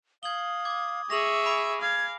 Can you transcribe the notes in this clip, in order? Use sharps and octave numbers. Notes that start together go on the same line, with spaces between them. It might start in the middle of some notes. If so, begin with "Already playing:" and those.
F5 D#6 G#6 F#7 G7
D6 G#6
G#4 E5 C#6 A#6 F7 F#7
G#5 B5 D7
F5 G#6